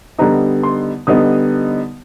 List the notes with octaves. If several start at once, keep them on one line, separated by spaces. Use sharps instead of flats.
D3 G3 B3 D#4 A#5
C6
D3 G3 B3 D#4 D#6